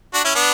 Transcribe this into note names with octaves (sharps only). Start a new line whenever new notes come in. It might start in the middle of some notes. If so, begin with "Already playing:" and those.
D4 F#4
C#4 E4
B3 D4